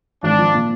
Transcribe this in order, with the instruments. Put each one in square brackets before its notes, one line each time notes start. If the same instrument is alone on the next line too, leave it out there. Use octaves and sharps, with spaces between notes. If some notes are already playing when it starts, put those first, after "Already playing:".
[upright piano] G#1 [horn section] D4
[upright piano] F3
A#2